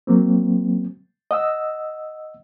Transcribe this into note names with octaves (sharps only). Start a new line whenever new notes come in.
F#3 A#3 C4
D#5 F#5 E6